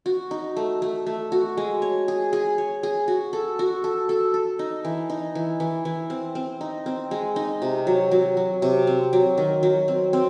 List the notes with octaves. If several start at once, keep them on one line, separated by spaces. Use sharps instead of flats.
F#4
D#4
A3
A3
A3
F#4
G#3
C#5
G#4
G#4
C#5
G#4
F#4
A4
F#4
A4
A4
A4
D#4
E3
D#4
E3
E3
E3
C4
C4
D#4
C4
G#3
D#4
C3
F#3
F#3
F#3
C3
C4
F#3
D#3
F#3
C4
C4